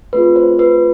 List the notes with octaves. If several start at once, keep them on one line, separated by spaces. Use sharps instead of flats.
A3 C4 F4 G#4 B4
C5
B4